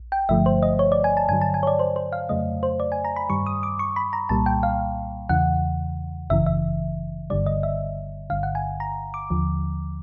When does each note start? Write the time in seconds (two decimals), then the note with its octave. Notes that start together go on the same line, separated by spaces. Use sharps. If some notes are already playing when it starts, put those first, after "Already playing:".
Already playing: A#1
0.12 G5
0.29 G1 G2 D3 F3 A3 E5
0.46 C5
0.63 D#5
0.79 C#5
0.92 D5
1.04 G#5
1.17 A5
1.29 G2 D3 F#3 G#5
1.41 A5
1.54 G#5
1.63 C#5
1.67 D5
1.79 C5
1.96 C5
2.12 F5
2.29 F2 C#3 F#3 A3 D#5
2.63 C5
2.80 D5
2.92 G#5
3.05 A#5
3.16 B5
3.29 G2 D#3 G3 C#6
3.46 D#6
3.63 D6
3.79 C#6
3.96 B5
4.13 A#5
4.29 C2 A#2 G3 A#3 A5
4.46 G5
4.63 F5
5.29 E2 C#3 E3 F#5
6.30 G1 F#2 C#3 E3 E5
6.46 E5
7.30 G1 G2 D3 G3 D5
7.46 D#5
7.63 E5
8.30 G1 G2 D3 F5
8.43 F#5
8.55 G#5
8.80 A#5
9.14 D6
9.30 D#2 D3 F3